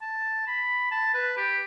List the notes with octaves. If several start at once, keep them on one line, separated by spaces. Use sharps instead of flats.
A5
B5
A5
B4
G4